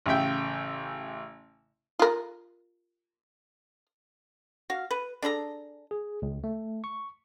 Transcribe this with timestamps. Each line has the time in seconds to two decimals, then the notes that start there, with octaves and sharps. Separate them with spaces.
0.06 A1 C#3 E5 G5
1.99 F4 A#4
4.70 F#4 F5
4.91 B4
5.22 D4 G#4 A4 A#5
5.91 G#4
6.22 C#2
6.44 A3
6.84 C#6